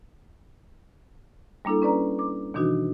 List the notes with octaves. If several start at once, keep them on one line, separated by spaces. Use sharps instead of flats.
G3 A#3 D4 E4 A4
C#4 B4 D5 A#5
D6
B2 D#3 E3 D4 D#4 F#4